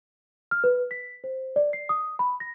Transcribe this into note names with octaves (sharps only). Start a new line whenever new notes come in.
F6
B4
B6
C5
D5
C7
D#6
B5
A#6